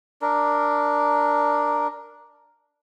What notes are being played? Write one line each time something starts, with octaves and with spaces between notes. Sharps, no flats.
D4 A#4